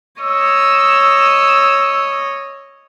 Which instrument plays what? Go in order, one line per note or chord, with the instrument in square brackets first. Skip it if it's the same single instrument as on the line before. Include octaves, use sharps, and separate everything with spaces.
[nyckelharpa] C#5 D#5 [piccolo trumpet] E6